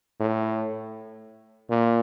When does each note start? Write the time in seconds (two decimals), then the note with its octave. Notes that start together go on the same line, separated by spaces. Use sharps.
0.20 A2
1.70 A#2